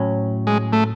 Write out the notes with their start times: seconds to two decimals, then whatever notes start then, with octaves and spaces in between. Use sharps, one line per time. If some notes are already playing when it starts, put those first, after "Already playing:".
Already playing: A2 F#3 C#4
0.47 G#3
0.73 A3